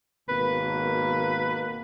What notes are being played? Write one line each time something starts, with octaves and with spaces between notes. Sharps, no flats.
G#1 B2 A#3 B4